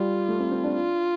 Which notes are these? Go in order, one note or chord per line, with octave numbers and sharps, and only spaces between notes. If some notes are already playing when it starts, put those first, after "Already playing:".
Already playing: G3 F4
A3
C4
C4
D4
F4